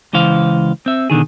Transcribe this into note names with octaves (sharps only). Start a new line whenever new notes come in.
C#2 E3 C5 F5
C4 E5
B2 D3 D#3 G#4